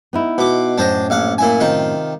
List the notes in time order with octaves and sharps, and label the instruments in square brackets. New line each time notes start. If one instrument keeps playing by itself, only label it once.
[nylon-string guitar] B3 D#4 E4
[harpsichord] B2 D6
[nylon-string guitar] F#2 A2 [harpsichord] D4 C5 D#5
[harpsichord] A#1 F5 F#5
A#2 E4 G#5
C3 D#3 F4